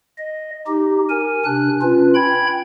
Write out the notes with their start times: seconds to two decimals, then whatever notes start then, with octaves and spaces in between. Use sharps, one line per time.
0.18 D#5
0.67 D#4 G4
1.10 A#4 G#5
1.45 C3 D4 F#6
1.82 C#4 F4 B4
2.15 G5 B5 G#6